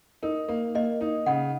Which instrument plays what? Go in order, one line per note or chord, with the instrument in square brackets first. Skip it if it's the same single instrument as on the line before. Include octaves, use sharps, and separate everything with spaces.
[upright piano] D#4 [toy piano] A#4
[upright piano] A#3
[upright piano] A#3 [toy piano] D#5
[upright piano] D#4
[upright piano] C#3 [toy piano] F#5